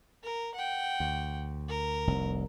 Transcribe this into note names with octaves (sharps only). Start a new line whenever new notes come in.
A#4
F#5 G5
D2
A#4
F1 C2